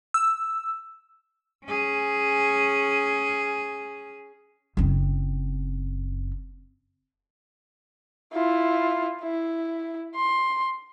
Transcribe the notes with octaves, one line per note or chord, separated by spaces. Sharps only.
E6
C#4 G#4
F#1 C4
E4 F4
E4
C6